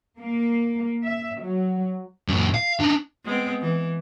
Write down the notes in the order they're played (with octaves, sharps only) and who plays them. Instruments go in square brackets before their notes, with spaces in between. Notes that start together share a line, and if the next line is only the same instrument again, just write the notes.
[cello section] A#3
E5
F#3
[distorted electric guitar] F#2 A#2
F5
D4 D#4
[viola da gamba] G#3 B3 C4
E3